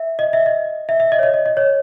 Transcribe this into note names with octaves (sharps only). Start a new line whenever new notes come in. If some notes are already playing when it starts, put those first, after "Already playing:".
Already playing: E5
D#5
E5
D#5
E5
E5
D#5
C#5
D#5
D#5
D#5
C#5